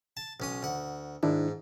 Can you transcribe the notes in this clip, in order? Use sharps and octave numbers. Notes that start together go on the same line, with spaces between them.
A5
B1 C#4 D#6
D2 F#5
G#2 D#3 D4 E4